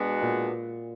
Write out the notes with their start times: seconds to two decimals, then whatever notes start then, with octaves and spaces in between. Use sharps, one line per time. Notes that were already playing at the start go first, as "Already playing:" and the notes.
Already playing: B2 G#3 B3 D4 F#4
0.22 A#2